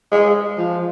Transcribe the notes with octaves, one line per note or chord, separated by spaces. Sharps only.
G#3
F3